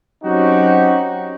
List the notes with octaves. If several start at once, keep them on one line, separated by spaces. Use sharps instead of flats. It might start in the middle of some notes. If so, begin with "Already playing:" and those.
F#3 C4 C#4 D#4 F#4 G4